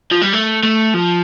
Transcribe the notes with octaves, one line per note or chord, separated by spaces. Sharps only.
F3
G3
A3
A3
F3